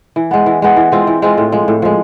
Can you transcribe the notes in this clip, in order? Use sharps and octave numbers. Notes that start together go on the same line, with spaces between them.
E3
G#3 B3
E3
G#3 B3
E3
G#3 C4 F4
E3
G#3 C4 F4
A2
F3 G#3
A2
F3 G#3